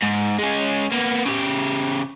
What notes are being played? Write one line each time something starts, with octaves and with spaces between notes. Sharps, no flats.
G#2
G#3 C#4
A#3 B3
C#3 G4